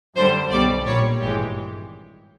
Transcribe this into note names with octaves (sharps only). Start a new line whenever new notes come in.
F#2 D3 G3 C5
B1 B2 G3 D5
A#1 A#2 G3 C#5
G#1 G2 E3 G#3 G4